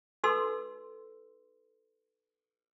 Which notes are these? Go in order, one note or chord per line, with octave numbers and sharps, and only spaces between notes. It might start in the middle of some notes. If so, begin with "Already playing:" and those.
D#4 F#4 A4 B4 C6 E6